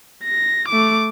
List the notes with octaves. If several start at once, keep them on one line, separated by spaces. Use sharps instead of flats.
A#6
A3 D6